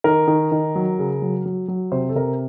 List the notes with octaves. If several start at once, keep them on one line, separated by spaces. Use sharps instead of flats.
D#3 A#4
D#3
D#3
F#3
C#3
F#3
F#3
F#3
C3 C5
A4
C3 A#4